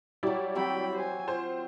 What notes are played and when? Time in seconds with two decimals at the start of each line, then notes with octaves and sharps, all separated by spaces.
0.23 F#3 G3 E4 G4 D5
0.55 F#3 C4 G5 B5
0.94 C5 G#5
1.28 F4 C5